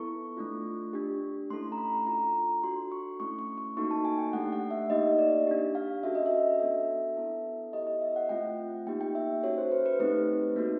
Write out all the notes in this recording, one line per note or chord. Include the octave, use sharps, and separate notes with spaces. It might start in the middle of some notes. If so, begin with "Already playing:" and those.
Already playing: B3 E4 A4 C#6
A3 D4 F4
D4 G4
A3 C#4 E4 A4 C6
A#5
B5
D4 F4 A4 A#5
D4 F#4 A4 C6
C#6
A3 C#4 E4 C#6
C#6
C#6
A#3 D#4 F#4 A4 C#6
A5
G#5
G5
A3 D4 G4 F#5
F#5
E5
A#3 D#4 G4 D#5
D5
D4 G4
F5
C#4 F#4 A4 E5
D#5
E5
B3 D4 F#4 A4
B3 E4 A4
B3 E4 G4 D#5
D#5
E5
F#5
A3 C4 F4 G5
A#3 D#4 G4 G5
G5
E5
C#4 F#4 A4 C#5
C5
B4
B4
A3 C4 D#4 G4 B4
A#3 D#4 F#4 A4